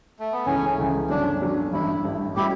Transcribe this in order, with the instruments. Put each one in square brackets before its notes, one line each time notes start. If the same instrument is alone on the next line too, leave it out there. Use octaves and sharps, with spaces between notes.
[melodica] A3
B3
[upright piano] C#2 C#3 E3 A3 [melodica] C#4
[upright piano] C#2 C#3 E3 A3
[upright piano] G1 G2 D3 F#3 C#4 [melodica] D4
[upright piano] G1 G2 D3 F#3 C#4
[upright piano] A1 G2 E3 [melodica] E4
[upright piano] A1 G2 E3
[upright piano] A2 G3 C#4 F#4 [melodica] E4 G4